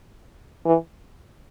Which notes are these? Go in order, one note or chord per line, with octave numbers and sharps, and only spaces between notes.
E3